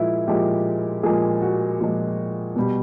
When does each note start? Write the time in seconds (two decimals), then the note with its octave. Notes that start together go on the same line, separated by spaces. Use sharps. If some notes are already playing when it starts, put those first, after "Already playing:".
Already playing: A#2 F3 G#3 E4 F4
0.27 A#2 F3 G#3 G4
1.03 A#2 F3 G#3 G#4
1.42 F#4
1.80 A#2 F3 G#3
2.56 B2 G3